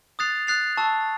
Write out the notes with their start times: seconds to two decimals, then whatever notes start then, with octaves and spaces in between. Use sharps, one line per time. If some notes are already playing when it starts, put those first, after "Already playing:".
0.19 D#6 F#6 A6 C7 F7
0.47 D#6 F#6 A6 C7 F7
0.77 A5 C#6 E6